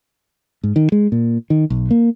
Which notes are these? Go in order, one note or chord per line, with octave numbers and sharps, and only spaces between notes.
G#2
D#3
G#3
A#2
D#3
B1
A#3